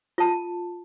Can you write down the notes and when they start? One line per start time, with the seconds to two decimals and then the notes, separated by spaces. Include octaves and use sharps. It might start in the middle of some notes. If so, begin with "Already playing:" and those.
0.18 F4 A5